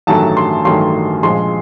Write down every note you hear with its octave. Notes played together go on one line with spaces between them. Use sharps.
A1 G2 D#3 F#3 A3 A5
C6
A1 G2 D#3 F#3 A3 C6
A#1 A#2 F3 G#3 C6